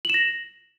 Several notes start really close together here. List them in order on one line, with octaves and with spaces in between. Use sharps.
F#7 E7 A#6